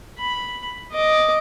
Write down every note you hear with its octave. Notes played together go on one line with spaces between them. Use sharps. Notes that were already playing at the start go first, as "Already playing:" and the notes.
B5
D#5 D6